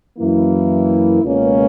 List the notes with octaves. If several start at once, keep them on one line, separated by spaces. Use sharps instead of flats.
F#2 E3 A#3 E4
C#2 B2 A#3 C#4